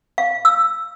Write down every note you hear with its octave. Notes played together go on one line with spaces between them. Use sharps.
F5
E6